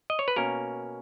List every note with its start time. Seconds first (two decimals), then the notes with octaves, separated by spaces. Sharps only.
0.10 D#5
0.19 C#5
0.28 B4
0.36 B2 A#3 C#4 A#4